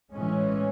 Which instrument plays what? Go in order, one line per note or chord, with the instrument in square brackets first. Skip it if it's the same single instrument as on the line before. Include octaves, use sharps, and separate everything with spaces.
[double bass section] A2 E3 G#3 C#4